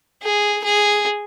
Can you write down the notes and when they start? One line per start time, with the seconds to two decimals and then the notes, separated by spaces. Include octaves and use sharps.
0.23 G#4
0.64 G#4